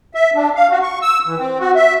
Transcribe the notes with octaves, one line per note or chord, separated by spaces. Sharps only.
E5
D4
F5
F#4
C#6
E6
E3
C4
F#4
E5